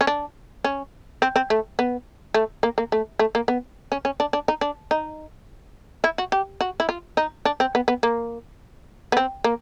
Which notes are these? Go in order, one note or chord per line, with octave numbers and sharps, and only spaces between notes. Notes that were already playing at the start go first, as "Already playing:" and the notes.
C#4
D4
C#4
C4
C4
A3
B3
A3
A#3
A#3
A3
A3
A#3
B3
C#4
C#4
D4
D4
D#4
D4
D#4
E4
F#4
G4
F#4
E4
F4
D#4
D4
C4
B3
B3
A#3
B3
C4
A#3